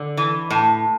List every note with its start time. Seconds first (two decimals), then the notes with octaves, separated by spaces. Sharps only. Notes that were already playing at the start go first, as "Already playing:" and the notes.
Already playing: D3
0.17 E3
0.51 A2